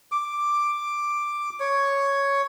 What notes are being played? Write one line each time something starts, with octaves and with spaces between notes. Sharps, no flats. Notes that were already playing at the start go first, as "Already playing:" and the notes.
D6
C#5